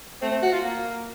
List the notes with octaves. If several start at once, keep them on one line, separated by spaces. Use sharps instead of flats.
A3 C4
C4
F#4
F4
A#3